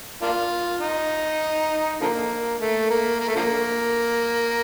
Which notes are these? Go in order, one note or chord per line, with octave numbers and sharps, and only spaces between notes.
A#3 D4 F4
D#4
D3 F3 A#3
A3
A#3
A#3
A3
D3 F3 A#3